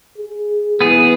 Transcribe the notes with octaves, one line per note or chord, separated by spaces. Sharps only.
G#4
E3 B3 G#4